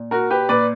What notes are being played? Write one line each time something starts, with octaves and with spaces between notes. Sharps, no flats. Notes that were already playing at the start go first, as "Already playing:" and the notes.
Already playing: A#2
F#4 A#4
G4 B4
A#2 B4 D5